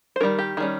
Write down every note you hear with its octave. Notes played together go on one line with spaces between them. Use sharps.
C5
D#3 G3 C#4 A#4
G4
D#3 G3 C#4 G#4